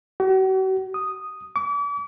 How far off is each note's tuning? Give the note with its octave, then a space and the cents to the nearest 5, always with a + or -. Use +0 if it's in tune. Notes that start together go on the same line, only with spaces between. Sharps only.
F#4 +45
D#6 -5
D6 -40